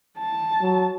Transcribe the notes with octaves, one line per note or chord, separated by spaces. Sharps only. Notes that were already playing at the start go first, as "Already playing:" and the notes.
A5
F#3